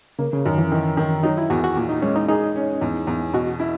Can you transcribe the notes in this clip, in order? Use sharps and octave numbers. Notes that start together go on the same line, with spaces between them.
C#3 A#3
C#3
F#2 D#3
E3
D#3
D#3
F#3 D#4
E4
E2 F#4
F#4
A#2
D#4
G#3 C#4
D#4
D#4 G#4
C#4
E2
E2
B2 F#4
E4